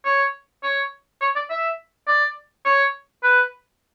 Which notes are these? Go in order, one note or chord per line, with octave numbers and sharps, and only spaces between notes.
C#5
C#5
C#5
D5
E5
D5
C#5
B4